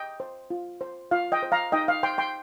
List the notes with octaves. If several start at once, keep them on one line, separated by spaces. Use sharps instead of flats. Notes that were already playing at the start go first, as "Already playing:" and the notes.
Already playing: D#5 G5
C5
F4
C5
F4 F5
D#5 G5
C5
F5 A#5
D#4 D#5 G5
F5
C5 G5 C6
G5 C6